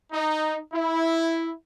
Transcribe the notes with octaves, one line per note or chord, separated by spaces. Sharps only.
D#4
E4